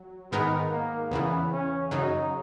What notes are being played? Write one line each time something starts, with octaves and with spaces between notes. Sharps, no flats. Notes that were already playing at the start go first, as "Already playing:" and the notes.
Already playing: F#3
G#2 D#3 G#3 B3 D#4 A#4
A#3
E2 C#3 E3 B3
C#4
F#2 C#3 F#3 D#4